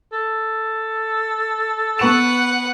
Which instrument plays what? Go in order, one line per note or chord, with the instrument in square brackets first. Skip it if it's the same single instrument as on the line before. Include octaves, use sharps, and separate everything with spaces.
[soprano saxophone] A4
[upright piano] B3 C#6 E7 [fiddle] B4 F#5